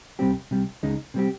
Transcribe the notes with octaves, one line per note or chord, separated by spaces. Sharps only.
C2 C3 G3 C4 G4
C2 C3 G3
C#2 C#3 G#3 D#4
C3 G3 C4 G4